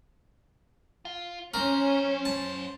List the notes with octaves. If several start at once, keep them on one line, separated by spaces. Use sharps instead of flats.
F4
F#2 C#4 A#4 C5
A5